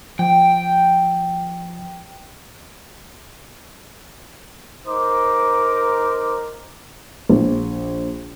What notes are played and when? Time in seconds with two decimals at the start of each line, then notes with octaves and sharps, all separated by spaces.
0.19 F3 G5
4.87 D#4 A#4 C5 D6
7.29 A#1